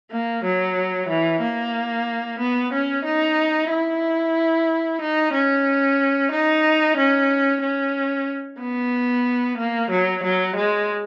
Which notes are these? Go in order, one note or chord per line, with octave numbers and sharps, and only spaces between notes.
A#3
F#3
E3
A#3
B3
C#4
D#4
E4
D#4
C#4
D#4
C#4
C#4
B3
A#3
F#3
F#3
G#3